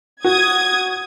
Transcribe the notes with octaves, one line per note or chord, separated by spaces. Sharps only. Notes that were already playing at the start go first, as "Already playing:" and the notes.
F#4 D#6 G#6